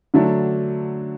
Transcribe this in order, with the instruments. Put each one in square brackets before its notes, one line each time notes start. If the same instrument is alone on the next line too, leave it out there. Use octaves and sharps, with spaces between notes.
[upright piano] D3 F#3 A3 D4